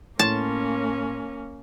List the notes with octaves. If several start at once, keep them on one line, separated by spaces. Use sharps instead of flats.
A2 A#3 C#4 C#5 A5 C6